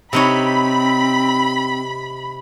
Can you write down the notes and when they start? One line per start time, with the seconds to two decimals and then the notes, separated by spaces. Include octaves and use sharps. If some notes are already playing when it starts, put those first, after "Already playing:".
0.13 C3 C4 D#4 C#5 B5